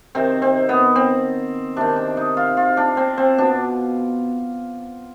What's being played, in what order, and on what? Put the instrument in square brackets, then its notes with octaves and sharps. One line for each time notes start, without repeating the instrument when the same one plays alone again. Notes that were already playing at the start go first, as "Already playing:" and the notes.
[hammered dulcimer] C3 D#3 C4
C4
B3
C4
C3 D#3 D4
D4
D#4
F4
F4
D4
C4
C4
B2 D4